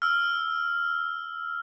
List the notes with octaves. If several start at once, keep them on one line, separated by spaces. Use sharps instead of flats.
E6 F6